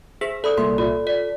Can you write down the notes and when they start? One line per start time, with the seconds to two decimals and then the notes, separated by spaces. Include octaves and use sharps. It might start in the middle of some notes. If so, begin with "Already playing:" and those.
0.21 G#4 C5 E5
0.44 A4 D5 B5 D#6
0.58 C2 A#2 E5 C6
0.78 F4 D5
1.07 D5 B6